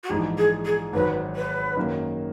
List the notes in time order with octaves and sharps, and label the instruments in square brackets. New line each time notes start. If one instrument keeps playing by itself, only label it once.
[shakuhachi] F#4
[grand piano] A#1 G#2 E3 [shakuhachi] G#4
[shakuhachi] G#4
G#4
[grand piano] G#1 G#2 F#3 [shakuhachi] B4
[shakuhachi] B4
[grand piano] F#2 D#3 A#3